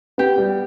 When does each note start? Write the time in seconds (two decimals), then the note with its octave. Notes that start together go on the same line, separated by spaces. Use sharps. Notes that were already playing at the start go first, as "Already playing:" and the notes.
0.18 B3 G4
0.38 G3